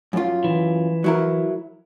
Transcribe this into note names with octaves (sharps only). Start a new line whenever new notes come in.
F#2 F4
E3
F#3 E4 A#4